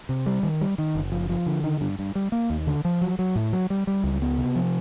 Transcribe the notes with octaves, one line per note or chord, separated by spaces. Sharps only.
C3
G3
D#3
G3
D#3
F#1
F3
F3
D3
D#3
G2
G2
G3
A#3
D#2
D3
F3
F#3
F#3
A2
F#3
G3
G3
C#2
B3
C3
F3